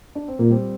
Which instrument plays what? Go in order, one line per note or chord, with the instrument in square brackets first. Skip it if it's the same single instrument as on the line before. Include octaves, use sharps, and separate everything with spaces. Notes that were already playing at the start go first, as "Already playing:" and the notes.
[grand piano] D4
C4
[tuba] A#2 [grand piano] A#3
[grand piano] G3 C4